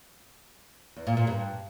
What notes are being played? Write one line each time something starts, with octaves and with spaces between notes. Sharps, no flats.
E2
A#2
A#2
G2